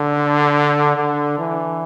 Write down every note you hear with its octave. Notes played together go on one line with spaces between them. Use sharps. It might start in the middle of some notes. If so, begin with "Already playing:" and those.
Already playing: D3
D3
E3